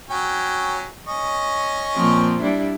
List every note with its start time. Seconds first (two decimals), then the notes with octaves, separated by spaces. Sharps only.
0.10 F#3 C#4 G5
1.07 C#4 D#5 C#6
1.95 A#2 F3 C4
2.42 G3 D4 E4